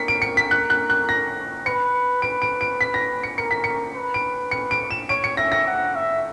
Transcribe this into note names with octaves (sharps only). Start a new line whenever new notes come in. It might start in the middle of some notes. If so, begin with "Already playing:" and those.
Already playing: A#4 B6 C#7
D7
C#7
B6
F#6
F#6
F#6
A#6
B4 C#7
B4 D7
D7
D7
B6
A#6
C#7
A#4 C#7
B6
C#7
B4
D7
C#7
D7
E7
C#5 D7
C#7
E5 A#6
A#6
F#5
E5